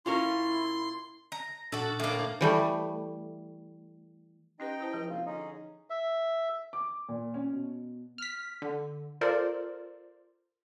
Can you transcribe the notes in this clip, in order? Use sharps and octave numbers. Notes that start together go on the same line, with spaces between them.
A#2 C#4 E4 F4 A#4 C6
A#5
A#2 D4 F#4 A4
A2 A#3
E3 G3 A3
C#4 D#4 G4 B4 D#5 G5
E4 C5 A5
C#2 F3
C3 A#3 C4 F4
D3 C#4 D#4 G#4
E5
D6
A#2
C#4
B2
F6 B6
D3
F4 A4 A#4 C5 D5